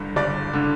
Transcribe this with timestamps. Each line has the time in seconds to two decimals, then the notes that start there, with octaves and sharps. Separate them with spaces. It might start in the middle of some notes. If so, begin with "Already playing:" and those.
Already playing: G1 G2 D3
0.16 G1 D5
0.53 D3